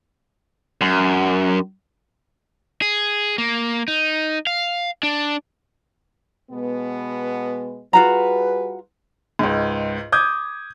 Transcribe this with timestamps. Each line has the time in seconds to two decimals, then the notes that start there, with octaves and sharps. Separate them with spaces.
0.81 F#2
2.82 G#4
3.38 A#3
3.88 D#4
4.47 F5
5.03 D4
6.51 B2 G#3 B3
7.93 G3 F4 F#4 G#4 B4 A#5
9.39 C#2 G#2
10.12 D6 D#6 G6 G#6